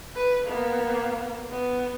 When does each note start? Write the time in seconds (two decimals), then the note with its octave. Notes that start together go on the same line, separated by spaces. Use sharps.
0.16 B4
0.47 A#3 B3
1.50 B3